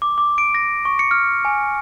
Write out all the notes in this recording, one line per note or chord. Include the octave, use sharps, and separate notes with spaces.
D6
D6
D7
A#6
C#6
C#7
F6
G#5